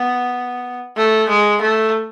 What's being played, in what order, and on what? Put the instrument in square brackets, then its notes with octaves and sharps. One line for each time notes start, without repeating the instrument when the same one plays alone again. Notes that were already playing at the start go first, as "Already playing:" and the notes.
Already playing: [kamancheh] B3
A3
G#3
A3